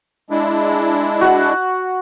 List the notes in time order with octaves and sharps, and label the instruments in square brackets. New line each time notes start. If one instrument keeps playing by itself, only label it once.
[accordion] G#3 D4 E4
[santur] F#4 F#5